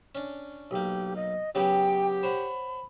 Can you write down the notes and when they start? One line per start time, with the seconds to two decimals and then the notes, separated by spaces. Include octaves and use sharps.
0.15 C#4 D4
0.71 B1 A#3 G4
1.16 D#5
1.55 C#3 F#3 B3 G4 G5
2.23 C5 C#5 F#5 B5